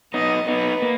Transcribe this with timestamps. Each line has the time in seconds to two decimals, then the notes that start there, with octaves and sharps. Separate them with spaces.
0.14 B3 D#4 D#5
0.48 B3 D#4 B4
0.82 A#3